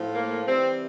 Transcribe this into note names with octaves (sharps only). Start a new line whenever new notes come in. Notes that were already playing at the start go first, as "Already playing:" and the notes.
Already playing: A2 F3
A#3
C3 E3 G3 C4